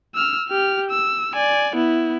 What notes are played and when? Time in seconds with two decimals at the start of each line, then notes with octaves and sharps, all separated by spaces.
0.15 E6 F6
0.49 G4 F6
0.91 E6
1.35 D5 G#5
1.76 B3 E4